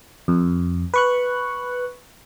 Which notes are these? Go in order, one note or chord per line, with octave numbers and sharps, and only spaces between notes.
F2
B4 C#6 F#6